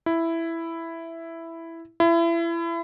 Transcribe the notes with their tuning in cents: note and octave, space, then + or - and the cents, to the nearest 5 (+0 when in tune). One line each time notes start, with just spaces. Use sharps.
E4 +5
E4 +30